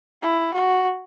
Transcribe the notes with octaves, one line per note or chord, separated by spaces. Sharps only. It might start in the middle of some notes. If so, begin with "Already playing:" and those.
E4
F#4